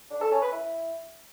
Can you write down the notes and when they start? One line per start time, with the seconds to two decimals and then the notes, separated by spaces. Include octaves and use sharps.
0.11 D4
0.21 A4
0.32 C#4
0.42 B4
0.52 E4